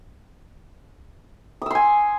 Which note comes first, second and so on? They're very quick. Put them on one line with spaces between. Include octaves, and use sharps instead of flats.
D#6 E6 C6 G#5